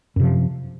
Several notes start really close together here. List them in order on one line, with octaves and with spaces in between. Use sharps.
F#2 C3 F3